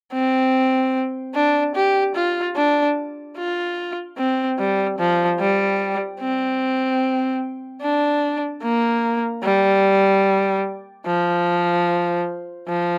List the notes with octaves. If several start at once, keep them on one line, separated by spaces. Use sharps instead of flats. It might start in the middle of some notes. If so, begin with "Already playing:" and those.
C4
D4
G4
F4
D4
F4
C4
G3
F3
G3
C4
D4
A#3
G3
F3
F3